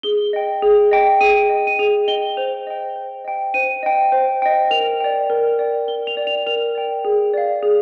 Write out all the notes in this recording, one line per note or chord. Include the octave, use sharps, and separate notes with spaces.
G#4 G7
D#5 G5
G#4
D#5 G5
G#4 D#7
D#5 G5
D#7
G#4 F7
D#5 G5 G7
C5 F7
D#5 G5
C5
D#5 G5
C5 D#7
D#5 G5
C5
D#5 G5
A#4 F7
D5 G5
A#4
D5 G5
A#4 G7
F7
D5 G5
F7
A#4 F7
D5 G5
G#4
D5 F5
G#4